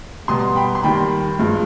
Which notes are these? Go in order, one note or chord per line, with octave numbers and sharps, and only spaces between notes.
B2 G3 B3 C6 D#6
G5 B5
C6
D#2 D#3 G3 G5 B5
G2 F3 G#3